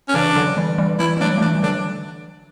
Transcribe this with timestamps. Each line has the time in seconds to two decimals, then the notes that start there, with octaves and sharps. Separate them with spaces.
0.08 C#4
0.14 C#3 E3 D4
0.36 D3 F#3
0.57 E3 G3
0.78 E3 G3
0.99 E3 G3 E4
1.17 G3
1.20 F#3 A3 D4
1.38 A3
1.41 E3 G3 D4
1.55 E3
1.63 D3 F#3 D4